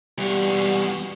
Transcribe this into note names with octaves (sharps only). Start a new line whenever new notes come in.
E2 G3 F#4